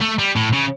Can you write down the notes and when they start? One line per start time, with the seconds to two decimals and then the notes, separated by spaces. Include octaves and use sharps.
0.01 A3
0.19 G3
0.36 A2
0.53 C#3